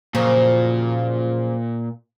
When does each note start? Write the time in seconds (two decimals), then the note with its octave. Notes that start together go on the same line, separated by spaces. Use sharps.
0.15 F#2 A#2 C#3 F3